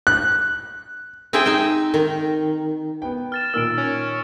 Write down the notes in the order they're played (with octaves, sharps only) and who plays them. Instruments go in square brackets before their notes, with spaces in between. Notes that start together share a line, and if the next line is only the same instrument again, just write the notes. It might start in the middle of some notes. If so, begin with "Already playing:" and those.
[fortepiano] F#6
[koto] C4 D#4 G#4 E5 G5
D#4 E5 G5
D#3
[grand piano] B3 B4 G5
[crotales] F6 A6 E7
[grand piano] A#2 D#3 A#3 [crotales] E6 F6 D7
[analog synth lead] C#4